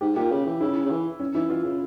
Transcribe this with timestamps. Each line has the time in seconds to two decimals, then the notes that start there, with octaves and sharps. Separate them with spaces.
0.01 G#2 G4
0.16 A#2 G4
0.31 C#3
0.46 E3
0.61 C#3 E4
0.86 C#3
0.91 E3
1.20 C#4
1.34 E3 E4
1.49 E3 F4
1.64 C#3